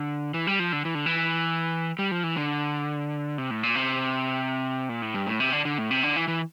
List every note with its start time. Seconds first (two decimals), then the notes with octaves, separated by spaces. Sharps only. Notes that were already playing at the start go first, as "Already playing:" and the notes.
Already playing: D3
0.34 E3
0.47 G3
0.59 F3
0.72 D3
0.85 E3
0.95 D3
1.06 E3
1.99 G3
2.11 F3
2.24 E3
2.37 D3
3.38 C3
3.51 A2
3.63 A#2
3.76 C3
4.89 A#2
5.02 A2
5.14 G2
5.27 A2
5.40 C3
5.53 D3
5.65 D3
5.78 A2
5.91 C3
6.03 D3
6.16 E3
6.28 E3